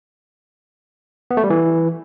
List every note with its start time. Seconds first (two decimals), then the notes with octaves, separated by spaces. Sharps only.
1.31 B3
1.37 A3
1.44 G3
1.50 E3